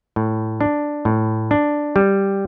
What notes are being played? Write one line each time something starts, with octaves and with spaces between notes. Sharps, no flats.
A2
D4
A2
D4
G3